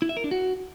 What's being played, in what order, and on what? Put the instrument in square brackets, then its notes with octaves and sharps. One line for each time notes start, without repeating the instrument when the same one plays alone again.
[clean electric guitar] E4
E5
A#4
D4
F#4